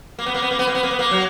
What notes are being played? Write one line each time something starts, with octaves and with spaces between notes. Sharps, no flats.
A#3
B3
A#3
B3
A#3
B3
A#3
B3
A#3
B3
A#3
F#3